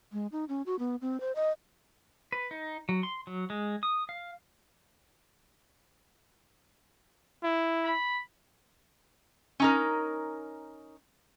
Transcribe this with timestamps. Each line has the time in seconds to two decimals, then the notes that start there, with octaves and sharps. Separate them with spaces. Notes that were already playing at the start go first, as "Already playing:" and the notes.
0.12 G#3
0.32 D#4
0.49 C#4
0.66 F#4
0.79 B3
1.01 C4
1.20 C5
1.36 D#5
2.32 B4
2.51 D#4
2.89 F#3
3.03 C6
3.27 F#3
3.50 G#3
3.83 D#6
4.09 F5
7.44 E4
7.85 B5
9.60 C#4 D#4 A#4